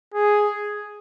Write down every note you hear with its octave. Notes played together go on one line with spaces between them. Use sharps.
G#4